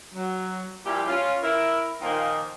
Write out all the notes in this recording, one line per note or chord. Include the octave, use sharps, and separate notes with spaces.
F#3
A#2 F3 G3 E4 G4
C#4 F4
E4 A#4
A#2 D#3 F3 A#3 D#4 F4